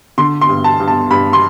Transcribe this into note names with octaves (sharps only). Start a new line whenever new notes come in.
D3 C6
C6
G2
A5
G2
A5
G2 B5
C6